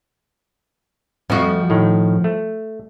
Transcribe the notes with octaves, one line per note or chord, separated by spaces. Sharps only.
F2 F3 A3 F#4
A2 D#3
A3